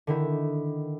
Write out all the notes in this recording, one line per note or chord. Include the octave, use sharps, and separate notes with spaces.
D3 D#3 E4